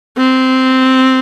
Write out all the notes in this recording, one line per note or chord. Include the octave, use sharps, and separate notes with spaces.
C4